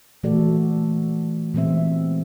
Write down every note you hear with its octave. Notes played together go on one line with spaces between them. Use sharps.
A#2 E3 A3 F#4 A4 D5
A#2 E3 G#3 B3 C4 E5